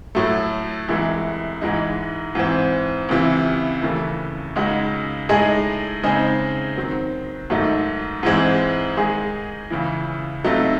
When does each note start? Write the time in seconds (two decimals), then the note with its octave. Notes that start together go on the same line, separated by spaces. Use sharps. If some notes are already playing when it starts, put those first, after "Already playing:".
0.15 A2 F#3 A3
0.88 C2 C3 E3 G#3
1.62 G#2 E3 G#3 D#4
2.35 G#2 E3 C4
3.09 C#2 C3 E3
3.82 D#2 C#3 E3 A3
4.56 C#2 C#3 G#3 D#4 F#4
5.29 A2 G#3 D#4 G#4
6.03 C#3 G#3 C4 D#4 G#4
6.77 D#3 F#3 C4
7.50 G#2 D#3 F#3 A3 D#4
8.23 G#2 E3 G#3 C4
8.97 D#3 G#3 D#4 G#4
9.70 C#2 C#3 E3
10.44 C#2 C3 F#3 A3 D#4